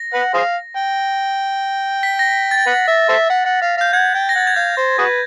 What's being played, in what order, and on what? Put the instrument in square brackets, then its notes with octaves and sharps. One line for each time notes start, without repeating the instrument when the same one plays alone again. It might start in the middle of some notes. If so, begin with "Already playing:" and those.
Already playing: [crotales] A#6
[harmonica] B4 F#5
G#4 C5 F5
G5
[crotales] B6
A#6
A6
[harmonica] G5
B4 F#5
E5
A4 C5 E5
F#5
F#5
F5
[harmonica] F5 [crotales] G6
[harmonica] F#5 [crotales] G#6
[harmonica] G5
[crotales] A#6
[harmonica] F#5 [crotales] A6
[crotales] G#6
[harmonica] F5 [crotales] G6
[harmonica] C5
F#4 G#4 B4